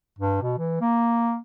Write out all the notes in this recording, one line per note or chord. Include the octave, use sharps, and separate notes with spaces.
G2
B2
E3
A#3